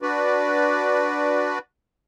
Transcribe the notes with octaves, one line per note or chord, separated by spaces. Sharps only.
D4 F#4 B4 D5